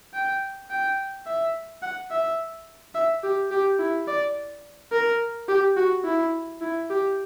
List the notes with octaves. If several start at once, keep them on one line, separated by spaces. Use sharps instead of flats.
G5
G5
E5
F#5
E5
E5
G4
G4
E4
D5
A#4
G4
F#4
E4
E4
G4